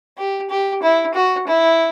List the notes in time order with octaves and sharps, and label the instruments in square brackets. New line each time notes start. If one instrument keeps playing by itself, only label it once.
[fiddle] G4
G4
E4
F#4
E4